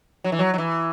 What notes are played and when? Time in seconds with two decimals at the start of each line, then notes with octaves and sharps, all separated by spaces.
0.24 F#3
0.32 E3
0.39 F#3
0.54 F#3
0.58 E3